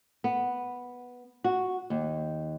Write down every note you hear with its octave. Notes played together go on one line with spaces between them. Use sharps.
B3
F#4
D#2